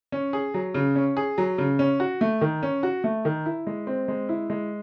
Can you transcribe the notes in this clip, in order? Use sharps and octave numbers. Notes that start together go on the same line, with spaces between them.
C#4
G#4
F#3
C#3
C#4
G#4
F#3
C#3
C#4
F#4
A3
D#3
C#4
F#4
A3
D#3
E4
G#3
C4
G#3
E4
G#3